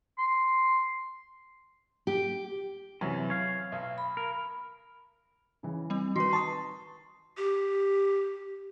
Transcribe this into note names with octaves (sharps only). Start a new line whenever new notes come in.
C6
G4
F#2 C3 E3
C#5 F5
B1
B5
A#4
C#3 E3
G3 C4
D#3 F#4 B4 C6
A5 C#6 D#6
G4